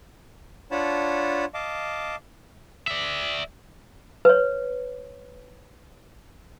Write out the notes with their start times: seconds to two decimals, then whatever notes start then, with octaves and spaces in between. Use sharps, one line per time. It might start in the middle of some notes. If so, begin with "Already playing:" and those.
0.71 D4 F4 C#5 F#5 A5 B5
1.54 D#5 F5 A5 D6
2.88 D5 E5
4.25 B4 C#5